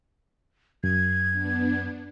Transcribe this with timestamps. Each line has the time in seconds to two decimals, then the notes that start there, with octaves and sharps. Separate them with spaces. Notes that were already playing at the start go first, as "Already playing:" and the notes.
0.84 F#2 G#6
1.29 B3 D4